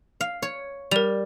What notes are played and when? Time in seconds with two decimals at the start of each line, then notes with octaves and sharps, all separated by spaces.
0.21 F5
0.42 C#5
0.91 G3 A#4 F7